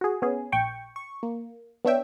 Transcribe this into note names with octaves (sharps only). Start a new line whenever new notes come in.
F#4 G#4
B3 C#4 G#4
A#1 G5 C#6
C#6
A#3
B3 D4 C#5 E5 G5